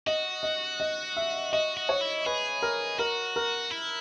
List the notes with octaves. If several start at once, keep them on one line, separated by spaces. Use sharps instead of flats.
F#4 D#5
D#5
D#5
E5
F#4 D#5
F#4
C#5
E4
G#4 B4
A#4
F#4 A#4
A#4
E4